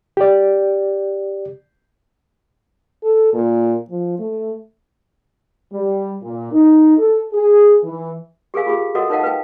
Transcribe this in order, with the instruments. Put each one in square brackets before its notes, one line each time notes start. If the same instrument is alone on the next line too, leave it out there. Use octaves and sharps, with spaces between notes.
[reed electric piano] G4 D5
[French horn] A4
A#2
F3
A3
[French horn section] G3
A#2
D#4
A4
G#4
E3
[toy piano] G4 G#4 A#4 F5 G#5
F4 G4 G#4 F5
F#4 A4 A#4 D#5 F#5
D#4 A#4 D#5 F5 F#5 A5
B4 F5 G5